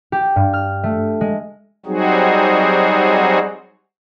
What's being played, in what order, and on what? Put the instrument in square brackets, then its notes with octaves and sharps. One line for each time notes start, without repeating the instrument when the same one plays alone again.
[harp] G4
G2
F6
A3
G#3
[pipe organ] F#3 G3 C4 D#4 F#4 G#4